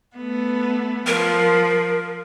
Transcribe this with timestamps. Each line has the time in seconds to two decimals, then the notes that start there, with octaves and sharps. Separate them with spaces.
0.17 A3 B3
1.07 F3 A#4